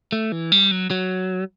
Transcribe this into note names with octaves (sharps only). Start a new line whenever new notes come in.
A3
E3
G3
F#3
F#3